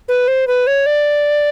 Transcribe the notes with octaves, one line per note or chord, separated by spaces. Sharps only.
B4
C5
B4
C#5
D5